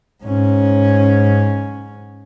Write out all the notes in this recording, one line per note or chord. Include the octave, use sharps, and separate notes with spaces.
G#2 C#4